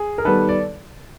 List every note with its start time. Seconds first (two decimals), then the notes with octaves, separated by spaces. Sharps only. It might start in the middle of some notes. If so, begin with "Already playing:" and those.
Already playing: G#4
0.18 A#4
0.25 D#3 G3 B3 A4 B4
0.49 D5